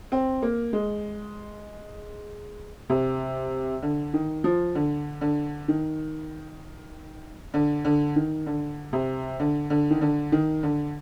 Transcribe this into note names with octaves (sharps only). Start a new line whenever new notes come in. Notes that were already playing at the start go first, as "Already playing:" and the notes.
C4
A#3
G#3
C3
D3
D#3
F3
D3
D3
D#3
D3
D3
D#3
D3
C3
D3
D3
D#3
D3
D#3
D3